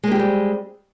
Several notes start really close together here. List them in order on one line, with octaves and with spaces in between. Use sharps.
G#3 A#3 G4 C4 G3